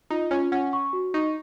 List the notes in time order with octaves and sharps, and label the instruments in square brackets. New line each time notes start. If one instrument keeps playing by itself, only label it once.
[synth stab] D#4 [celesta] F4
[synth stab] C#4 [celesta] F4
[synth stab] C#4 [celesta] F#5
[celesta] C#6
F#4
[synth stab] D#4 [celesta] C#6